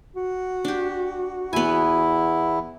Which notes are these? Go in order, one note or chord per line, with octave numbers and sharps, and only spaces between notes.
F#4
D4 G4
E2 B3 E4 G#5